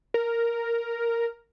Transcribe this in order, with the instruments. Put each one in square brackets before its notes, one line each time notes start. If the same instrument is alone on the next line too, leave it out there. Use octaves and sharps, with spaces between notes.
[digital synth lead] A#4